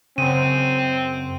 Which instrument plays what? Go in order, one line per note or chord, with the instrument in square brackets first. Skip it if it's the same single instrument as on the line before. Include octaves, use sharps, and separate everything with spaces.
[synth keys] F#2 C#3 [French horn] C4 [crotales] D#7